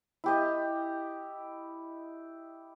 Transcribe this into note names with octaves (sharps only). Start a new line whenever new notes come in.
E4 G4 D#5